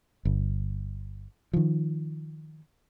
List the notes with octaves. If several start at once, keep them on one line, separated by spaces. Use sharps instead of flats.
G1
D#3 F3